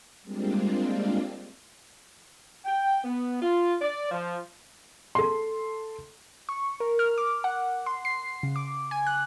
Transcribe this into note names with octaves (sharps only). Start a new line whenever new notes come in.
G3 G#3 A#3 C4 D4 F4
G5
B3
F4
D5
F3
A4 C6
C#6
A#4
F6
D6
F#5
C6
C7
C#3
D6
G#5
F#6